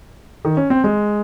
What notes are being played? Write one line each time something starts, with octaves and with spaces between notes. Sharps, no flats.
D#3
C#4
C4
G#3